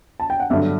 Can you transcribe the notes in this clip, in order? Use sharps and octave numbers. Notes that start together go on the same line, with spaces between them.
A5
G5
F#5
G1 G2 D3 F#3 E5